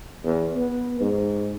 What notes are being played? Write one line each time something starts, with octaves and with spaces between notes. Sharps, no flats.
E2
B3
G#2